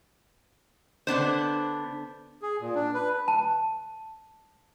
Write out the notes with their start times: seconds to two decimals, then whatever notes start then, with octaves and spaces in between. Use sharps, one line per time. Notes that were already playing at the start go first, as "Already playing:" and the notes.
1.07 D3 B3 D4 C5
2.42 G#4
2.61 A#2
2.75 D4
2.94 B4
3.28 A5